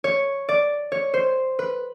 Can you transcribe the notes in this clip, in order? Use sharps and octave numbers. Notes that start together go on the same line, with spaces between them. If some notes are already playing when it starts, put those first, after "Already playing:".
C#5
D5
C#5
C5
B4